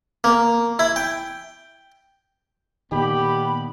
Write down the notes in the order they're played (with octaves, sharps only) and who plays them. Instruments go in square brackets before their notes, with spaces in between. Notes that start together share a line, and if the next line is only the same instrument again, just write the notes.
[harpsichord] A#3
E4
G5
[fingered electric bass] A#2 D#3 [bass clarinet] B3 [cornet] G4 [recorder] B5